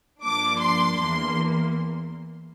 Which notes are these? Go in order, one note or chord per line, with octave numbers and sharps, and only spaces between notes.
G2 F3 A#3 D4 D6
C6
E2 E3 A#3 C6